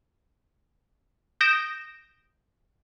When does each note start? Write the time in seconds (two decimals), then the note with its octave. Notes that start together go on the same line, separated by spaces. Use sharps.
1.41 D#6 G6 A#6 D7 E7